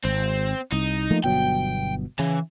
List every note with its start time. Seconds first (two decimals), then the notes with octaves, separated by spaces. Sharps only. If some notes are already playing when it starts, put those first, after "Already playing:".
0.05 G#1 C4
0.72 C2 D#4
1.11 F3 A3 A#3
1.24 G1 B2 F#3 G5
2.19 C#3 E3